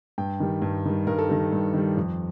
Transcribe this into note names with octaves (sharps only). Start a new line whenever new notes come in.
G2 G5
D#3 G3
G2
D#3 G3
G2 A#4
A4
D#3 G3 A#4
G2
D#3 G3
F2